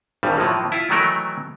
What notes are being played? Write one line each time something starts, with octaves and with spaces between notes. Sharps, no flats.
G#1 G2 C#3 G3
A2 F3 F#3 A#3
E4 F4
D#3 E3 F#3 A3 D#4 A#4